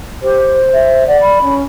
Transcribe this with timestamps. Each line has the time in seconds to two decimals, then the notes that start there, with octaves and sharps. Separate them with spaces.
0.22 G4 C5
0.73 E5
1.07 D5 F#5
1.21 B5
1.41 C#4